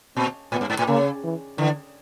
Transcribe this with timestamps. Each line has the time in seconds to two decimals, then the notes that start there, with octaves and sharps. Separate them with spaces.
0.17 A#2 C4
0.52 A2 B3
0.61 G2
0.70 G#2
0.79 A2
0.87 C#3 A#3
1.24 E3
1.58 D3 E3